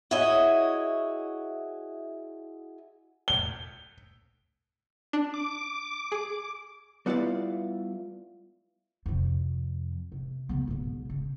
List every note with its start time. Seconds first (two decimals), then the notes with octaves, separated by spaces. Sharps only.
0.11 E4 F#4 G#4 C#5 D#5 E5
3.28 G7
5.13 D4
5.34 D6
6.12 G#4
7.06 G3 B3 E4 F4 D5
9.06 F2 C3
10.12 C3
10.49 C#3 B3
10.67 B1 G#2
11.10 C#3